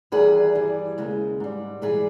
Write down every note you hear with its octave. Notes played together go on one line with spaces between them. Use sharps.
E2 D#3 G3 G#4 B4
G2 E3 G3
D#2 C#3 G#3
G#2 G3
G#2 E3 G3 G#4 B4